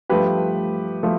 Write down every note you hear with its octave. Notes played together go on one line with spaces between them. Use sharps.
G2 F3 A3 G4 B4
F3 A3